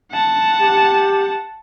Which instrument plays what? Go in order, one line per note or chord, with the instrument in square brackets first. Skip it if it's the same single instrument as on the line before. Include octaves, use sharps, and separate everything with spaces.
[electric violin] F#5 A5
[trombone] G4